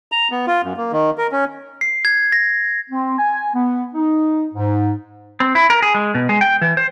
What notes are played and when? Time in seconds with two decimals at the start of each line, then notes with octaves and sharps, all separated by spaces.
0.12 A#5
0.31 B3
0.47 F4
0.63 F#2
0.77 A#3
0.92 D#3
1.18 A#4
1.32 C#4
1.81 C7
2.05 G#6
2.32 A#6
2.89 C4
3.18 G#5
3.54 B3
3.94 D#4
4.54 G#2
5.40 C4
5.55 E4
5.70 A#4
5.82 G#4
5.94 G#3
6.15 B2
6.29 G#3
6.41 G5
6.62 E3
6.77 C5